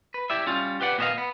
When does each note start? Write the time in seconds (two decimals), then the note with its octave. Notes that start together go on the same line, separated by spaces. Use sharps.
0.14 B4
0.30 E4 G4 D5 E5
0.46 G3 C#4 F4
0.81 G4 B4 D5 F#5
0.98 A#2 B3 G4 C5 D#5 F5
1.18 B3